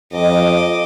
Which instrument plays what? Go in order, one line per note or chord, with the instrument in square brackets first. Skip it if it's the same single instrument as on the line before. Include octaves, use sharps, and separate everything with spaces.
[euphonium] F2 [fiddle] D#5 D6